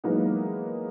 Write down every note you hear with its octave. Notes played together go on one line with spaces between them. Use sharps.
E3 F#3 G#3 A#3 B3 D#4